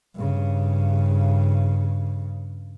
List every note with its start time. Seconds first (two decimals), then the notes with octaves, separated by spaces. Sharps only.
0.15 G2 C#3